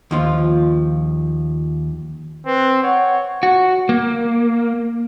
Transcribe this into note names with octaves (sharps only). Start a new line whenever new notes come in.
D#2 F3 F4
C4 B4
C#5 F#5
F#4
A#3